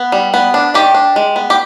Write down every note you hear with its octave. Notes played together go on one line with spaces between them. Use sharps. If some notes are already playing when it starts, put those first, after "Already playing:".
Already playing: B3
G3
B3
D4
D#3 G4
D4
G#3
B3
G4